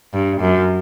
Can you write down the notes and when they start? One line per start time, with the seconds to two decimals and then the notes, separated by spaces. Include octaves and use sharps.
0.13 G2
0.41 F#2